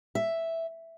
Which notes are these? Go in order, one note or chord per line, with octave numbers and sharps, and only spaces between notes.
E5